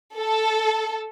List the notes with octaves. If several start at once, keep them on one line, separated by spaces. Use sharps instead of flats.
A4